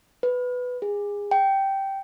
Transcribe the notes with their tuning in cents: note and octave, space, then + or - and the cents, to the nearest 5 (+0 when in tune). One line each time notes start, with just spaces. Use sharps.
B4 +10
G#4 -25
G5 -10